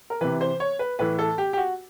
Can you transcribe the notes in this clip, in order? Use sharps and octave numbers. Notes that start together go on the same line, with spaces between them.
A#4
C3 E3 B4
C5
C#5
B4
A2 E3 B4
A4
G4
G4
F#4